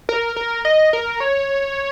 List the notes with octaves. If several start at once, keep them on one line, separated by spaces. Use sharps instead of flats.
A#4
A#4
D#5
A#4
C#5